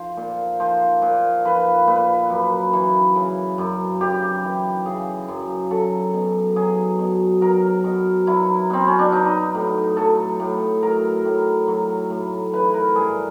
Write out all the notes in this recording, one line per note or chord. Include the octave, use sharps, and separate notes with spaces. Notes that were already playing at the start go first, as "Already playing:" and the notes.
Already playing: F3 C5
A#2
F3 C5
A#2
F3 B4
A#2 B4
F#2
E3
C#3
F#2
F#2 G4
E3
C#3 G#4
F#2
F#3 A4
B2
F#3 G#4
B2
F#3 A#4
B2
F#3 E4
B2 C4
C#4
D4
F#3 D#4
A2
F#3 A4
A2
F#3 A#4
A2
F#3
A2
E3 B4
A#4
G2 G#4